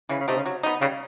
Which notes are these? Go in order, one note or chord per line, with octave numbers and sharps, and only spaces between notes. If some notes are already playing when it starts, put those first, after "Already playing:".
C#3 E3
C#3
C3 A3 C4 D#4
C#3
F#3
B3 D#4
C#3 G3